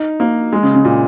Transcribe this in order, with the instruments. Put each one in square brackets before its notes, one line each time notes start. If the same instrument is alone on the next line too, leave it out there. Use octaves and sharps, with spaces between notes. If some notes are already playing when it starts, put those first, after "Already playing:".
Already playing: [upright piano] D#4
A#3
G#3
C#3
C#3
A#2